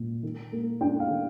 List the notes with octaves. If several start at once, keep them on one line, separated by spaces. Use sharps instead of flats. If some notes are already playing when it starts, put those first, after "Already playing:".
Already playing: A#2
D#3
A#3
D4 G5
F5
D#3